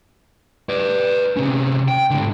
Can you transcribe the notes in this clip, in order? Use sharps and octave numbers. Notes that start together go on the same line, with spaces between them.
B4 D5
C3 C#4
G5
G#2 D3